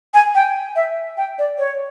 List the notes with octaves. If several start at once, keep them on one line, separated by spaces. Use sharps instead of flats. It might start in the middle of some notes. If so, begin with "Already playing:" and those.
G#5
G5
E5
G5
D5
C#5